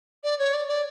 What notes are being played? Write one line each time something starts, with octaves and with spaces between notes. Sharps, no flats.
D5
C#5
D5
D5